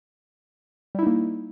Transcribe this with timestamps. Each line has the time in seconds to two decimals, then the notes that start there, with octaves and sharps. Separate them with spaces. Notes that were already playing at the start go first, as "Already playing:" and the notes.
0.95 G3
0.99 E4
1.03 D#4
1.07 A#3